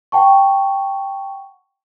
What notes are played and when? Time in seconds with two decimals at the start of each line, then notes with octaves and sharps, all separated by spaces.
0.12 F#5 G5 A5 C#6